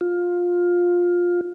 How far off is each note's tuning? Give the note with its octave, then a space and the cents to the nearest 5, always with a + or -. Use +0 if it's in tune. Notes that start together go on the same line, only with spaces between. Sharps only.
F4 +15